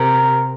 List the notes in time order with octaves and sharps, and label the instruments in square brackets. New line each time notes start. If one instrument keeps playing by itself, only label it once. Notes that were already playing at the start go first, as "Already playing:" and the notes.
Already playing: [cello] C3 [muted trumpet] A#4